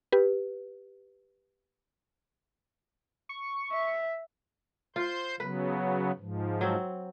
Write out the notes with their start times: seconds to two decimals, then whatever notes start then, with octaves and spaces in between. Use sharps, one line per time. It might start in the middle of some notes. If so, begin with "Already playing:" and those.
0.12 G4 B4
3.29 C#6
3.72 E5
4.96 F4 C5 C6 G6
5.40 C#3 F#3 B3 B4
6.19 G#2 F3
6.61 F#3 C4